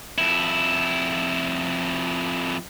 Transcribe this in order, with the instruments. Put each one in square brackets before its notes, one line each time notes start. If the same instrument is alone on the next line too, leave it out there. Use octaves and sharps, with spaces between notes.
[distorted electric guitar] F2 E4